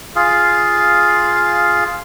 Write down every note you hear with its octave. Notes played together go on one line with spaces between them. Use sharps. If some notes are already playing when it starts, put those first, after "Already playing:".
F4 G#4 F5